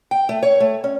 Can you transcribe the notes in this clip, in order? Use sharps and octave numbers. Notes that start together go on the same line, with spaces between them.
G5
A3
C#5
A3
C#4